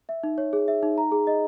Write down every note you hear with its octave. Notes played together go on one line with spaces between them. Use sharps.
E5
D#4
C#5
G#4
E5
D#4
A#5
G#4
D#5